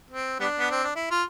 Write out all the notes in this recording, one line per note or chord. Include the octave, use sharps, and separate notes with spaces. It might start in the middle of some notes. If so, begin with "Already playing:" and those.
C4
G3 B3 D4
B3
C4
D4
E4
F4